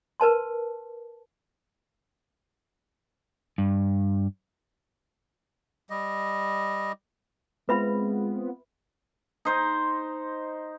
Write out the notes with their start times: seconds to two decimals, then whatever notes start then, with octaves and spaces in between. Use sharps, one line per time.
0.20 A#4 B4 A5 C6
3.58 G2
5.90 G3 D#5
7.69 G#3 B3 C4 F4 B4 E5 B5
9.45 D#4 C5